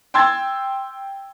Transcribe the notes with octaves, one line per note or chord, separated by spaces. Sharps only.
G5 C6 E6 G#6 A6